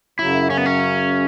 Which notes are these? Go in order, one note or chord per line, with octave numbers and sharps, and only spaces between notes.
F#2 C#3 F#3 E4
C#4
B3
C#4